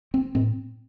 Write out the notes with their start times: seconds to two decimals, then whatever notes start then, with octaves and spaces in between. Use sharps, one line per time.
0.14 C4
0.35 A2 C4